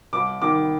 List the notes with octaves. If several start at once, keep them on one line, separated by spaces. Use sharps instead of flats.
C2 D6
D#3 D6